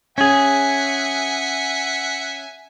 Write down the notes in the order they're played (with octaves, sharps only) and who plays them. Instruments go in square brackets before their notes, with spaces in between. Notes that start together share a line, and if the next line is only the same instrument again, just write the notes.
[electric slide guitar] C#4 G#4 [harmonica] E5 F#5 G#5